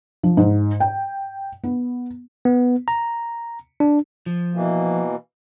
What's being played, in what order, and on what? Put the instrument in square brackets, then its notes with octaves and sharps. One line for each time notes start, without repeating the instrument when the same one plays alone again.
[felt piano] F3
G#2
G5
B3
[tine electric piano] B3
A#5
D4
[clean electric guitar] F3
[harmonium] B2 E3 A#3